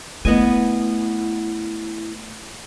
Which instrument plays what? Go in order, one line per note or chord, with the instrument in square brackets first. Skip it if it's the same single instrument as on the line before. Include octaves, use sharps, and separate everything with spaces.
[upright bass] A3 [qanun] B3 D#5 G#5 [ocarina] E4